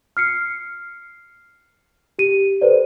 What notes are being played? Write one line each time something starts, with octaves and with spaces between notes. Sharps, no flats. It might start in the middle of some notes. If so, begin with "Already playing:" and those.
F6 C7 C#7
G4 D#7
A4 B4 C5 D5